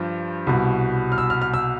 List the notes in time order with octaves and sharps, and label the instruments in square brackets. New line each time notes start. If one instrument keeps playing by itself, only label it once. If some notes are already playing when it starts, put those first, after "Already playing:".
Already playing: [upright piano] G2 F3
C2 B2
F6
E6
F6
F6
E6